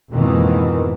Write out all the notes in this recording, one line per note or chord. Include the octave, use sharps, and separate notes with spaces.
F2 G#2 B2 D#3 E3 A#3